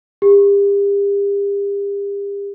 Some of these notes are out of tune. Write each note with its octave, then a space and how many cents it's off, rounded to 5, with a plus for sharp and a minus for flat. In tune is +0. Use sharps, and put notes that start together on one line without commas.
G4 +40